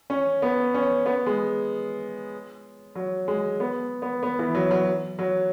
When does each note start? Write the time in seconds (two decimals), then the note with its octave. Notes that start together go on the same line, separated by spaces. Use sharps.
0.10 C#4
0.42 B3
0.74 C#4
1.06 B3
1.26 G#3
2.95 F#3
3.28 G#3
3.60 B3
4.02 B3
4.23 B3
4.39 E3
4.55 F#3
4.71 F#3
5.19 F#3